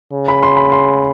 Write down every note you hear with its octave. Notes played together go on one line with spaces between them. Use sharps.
C#3
B5
C6
B5
C6